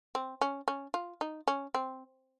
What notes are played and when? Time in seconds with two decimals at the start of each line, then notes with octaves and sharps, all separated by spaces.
0.15 C4
0.41 C#4
0.68 C#4
0.94 F4
1.21 D#4
1.48 C#4
1.74 C4